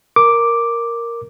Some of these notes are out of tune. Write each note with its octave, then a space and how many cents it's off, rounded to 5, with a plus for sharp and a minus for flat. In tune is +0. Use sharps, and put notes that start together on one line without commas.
A#4 +0 D6 +0